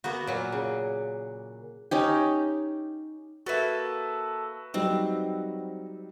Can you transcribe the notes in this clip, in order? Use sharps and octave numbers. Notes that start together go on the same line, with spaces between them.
A#3 B3 F#4
A#2 F#3
C#3
C#4 D#4 G4
A#3 F#4 A4 B4 E5
F#3 G3 C4 D#4